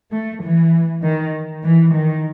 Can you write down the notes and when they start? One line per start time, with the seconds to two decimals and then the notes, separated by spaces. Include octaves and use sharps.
0.12 A3
0.42 E3
1.03 D#3
1.64 E3
1.94 D#3